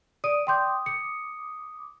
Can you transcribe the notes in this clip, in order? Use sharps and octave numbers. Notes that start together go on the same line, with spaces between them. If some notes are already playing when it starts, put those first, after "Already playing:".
D5 D#6 D#7
G5 C6 D6 D#6 G6
C#7